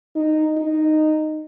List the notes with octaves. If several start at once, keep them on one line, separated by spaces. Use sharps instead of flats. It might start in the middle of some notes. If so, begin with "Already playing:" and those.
D#4
D#4